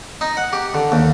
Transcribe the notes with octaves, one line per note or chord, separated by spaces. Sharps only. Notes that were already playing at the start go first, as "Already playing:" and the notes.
D#4
F#5
G4
D3
D#2